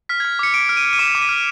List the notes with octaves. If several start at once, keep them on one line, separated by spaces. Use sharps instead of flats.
F6 B6
G#6
F6
D6 C#7
D6 D7
F6
D#7
F6
D#7
D6 E7
D6
D#7
F6